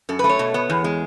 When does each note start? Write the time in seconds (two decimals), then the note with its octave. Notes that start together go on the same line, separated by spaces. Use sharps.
0.09 F#2 A4
0.19 B4
0.24 A3
0.29 C#5
0.39 B2
0.54 B3
0.70 E2
0.84 G#3